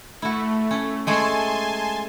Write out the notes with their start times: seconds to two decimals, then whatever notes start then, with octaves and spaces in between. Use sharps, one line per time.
0.22 A3 E4 F#4
0.71 C#4
1.07 G#3 A3 G#4 G#5 A5 C6